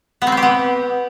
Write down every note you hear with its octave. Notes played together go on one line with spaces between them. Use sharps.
B3
C4
C5
G4
B3